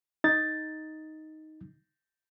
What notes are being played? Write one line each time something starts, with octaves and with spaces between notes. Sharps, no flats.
D#4 A6